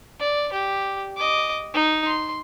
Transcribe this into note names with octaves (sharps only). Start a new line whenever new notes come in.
D5
G4
D#5 D6
D#4
C6